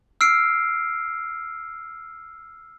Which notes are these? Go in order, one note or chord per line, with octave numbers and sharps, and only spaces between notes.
E6 F6 C7 D7